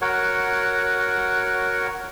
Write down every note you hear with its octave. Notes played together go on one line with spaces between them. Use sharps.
F#4 A#4 C#5 F#5